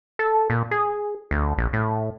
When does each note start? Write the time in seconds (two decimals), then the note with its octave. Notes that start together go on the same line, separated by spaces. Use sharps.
0.19 A4
0.50 A#2
0.71 G#4
1.31 D2
1.58 A#1
1.73 A2